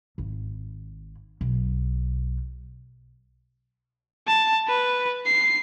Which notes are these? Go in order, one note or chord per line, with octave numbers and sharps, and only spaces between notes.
G#1
B1
A5
B4
C7